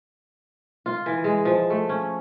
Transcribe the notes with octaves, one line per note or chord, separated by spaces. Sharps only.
F4
E3
G#3
F3
A3
C#4